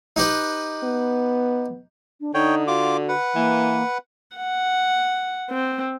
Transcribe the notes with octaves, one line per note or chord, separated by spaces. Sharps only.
D#4 G4 B4
B3
D4
D3 D#4 C#5 G5
F4 F#4 D6
B4 F#5
E3 A#3
F#5
C4